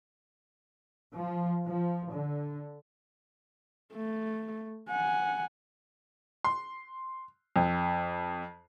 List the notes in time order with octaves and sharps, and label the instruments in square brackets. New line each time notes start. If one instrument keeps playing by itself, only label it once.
[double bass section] F3
F3
D3
[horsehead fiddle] A3
F#5 G#5
[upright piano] C6
F2